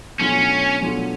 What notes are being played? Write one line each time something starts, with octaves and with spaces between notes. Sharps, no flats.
B2 F#3 A3 C#4 D4 F4
B2 F#3 A3 D4 F4